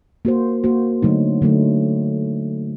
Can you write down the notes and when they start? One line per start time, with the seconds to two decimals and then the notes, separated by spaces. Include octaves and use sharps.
0.25 A#3 F#4 C5
0.64 A#3 F#4 C5
1.02 D3 F#3 A3 D#4
1.42 D3 F#3 A3 D#4